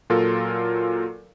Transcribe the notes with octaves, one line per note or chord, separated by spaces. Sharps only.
A#2 F#3 F4 A4 A#4